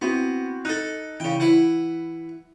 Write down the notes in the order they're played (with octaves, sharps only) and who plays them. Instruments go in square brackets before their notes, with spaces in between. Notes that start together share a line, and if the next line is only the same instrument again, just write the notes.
[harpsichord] B3 [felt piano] C4 E4 F#4
[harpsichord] D#4 A4 [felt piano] F#6
[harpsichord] C#3 G5 [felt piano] E3
[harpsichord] E4 B4 F#5